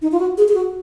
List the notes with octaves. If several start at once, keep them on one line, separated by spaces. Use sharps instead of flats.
D#4
F4
F#4
G#4
G#4
F#4